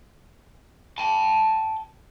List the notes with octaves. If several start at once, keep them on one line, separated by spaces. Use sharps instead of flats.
G5 A5